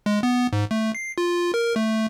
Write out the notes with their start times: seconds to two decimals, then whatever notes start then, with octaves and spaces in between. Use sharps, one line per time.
0.06 G#3
0.23 B3
0.53 G#2
0.71 A3
0.95 C7
1.18 F4
1.54 A#4
1.76 A3